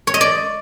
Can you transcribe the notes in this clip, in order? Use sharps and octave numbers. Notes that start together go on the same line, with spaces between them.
C#5
D#5
D5